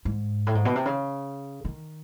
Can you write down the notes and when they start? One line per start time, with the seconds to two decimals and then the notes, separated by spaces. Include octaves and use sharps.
0.05 G#2
0.47 A2
0.55 G#2
0.65 B2
0.76 C3
0.85 C#3
1.65 D#3